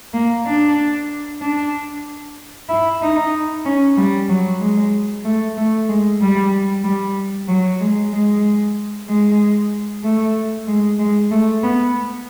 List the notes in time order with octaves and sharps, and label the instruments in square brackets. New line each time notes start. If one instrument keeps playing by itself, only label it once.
[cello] A#3
D4
D4
E4
D#4
C#4
G3
F#3
G#3
A3
A3
G#3
G3
G3
F#3
G#3
G#3
G#3
A3
G#3
G#3
A3
B3